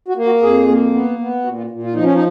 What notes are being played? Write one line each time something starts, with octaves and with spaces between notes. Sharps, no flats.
F#4
A#3
F#4
F2 G#4
A#3
B3
B3
A#2 F#4
F4
A#2
F4
F3 D#4
C#4
D#4